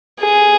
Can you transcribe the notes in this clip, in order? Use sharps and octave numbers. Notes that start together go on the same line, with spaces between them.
G#4